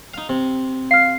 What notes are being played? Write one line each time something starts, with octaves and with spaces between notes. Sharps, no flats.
D#4 F5
C3
F5 F6 C7